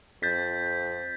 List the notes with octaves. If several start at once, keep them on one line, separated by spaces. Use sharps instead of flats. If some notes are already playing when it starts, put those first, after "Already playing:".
F2 G6 A6 B6